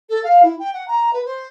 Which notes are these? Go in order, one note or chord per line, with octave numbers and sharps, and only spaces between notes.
A4
F5
E4
G5
F#5
A#5
B4
C5